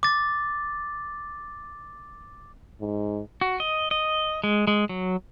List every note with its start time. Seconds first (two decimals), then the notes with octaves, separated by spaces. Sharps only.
0.03 D6 A6
2.81 G#2
3.41 F#4
3.60 D#5
3.91 D#5
4.44 G#3
4.67 G#3
4.89 F#3